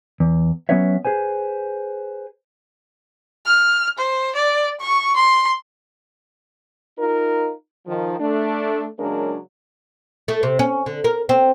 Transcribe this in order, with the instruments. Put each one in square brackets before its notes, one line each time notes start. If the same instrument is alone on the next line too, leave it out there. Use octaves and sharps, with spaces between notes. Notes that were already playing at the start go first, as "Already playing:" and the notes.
[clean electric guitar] E2
F#3 B3 C#4 B4 C#5 E5
G#4 B4 C5 G#5
[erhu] F6
C5
D5
C#6
C6
[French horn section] D#4 F4 A#4
D#3 F3
A3 D4
C#3 F#3 G#3 A#3 D4 A#4
[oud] A3
C3
C#4
D3
A#4
C4